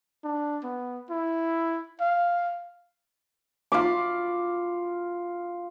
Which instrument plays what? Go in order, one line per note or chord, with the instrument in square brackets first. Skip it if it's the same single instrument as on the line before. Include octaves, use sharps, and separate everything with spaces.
[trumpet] D4
B3
E4
F5
[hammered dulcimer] F4 B5 D6